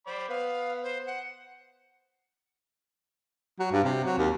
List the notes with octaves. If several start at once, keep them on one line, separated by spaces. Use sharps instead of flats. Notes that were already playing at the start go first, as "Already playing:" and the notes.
C5 D5 B5
B3 B4 F5
C5
F#5
F#3
G2
C3
F#3
D#2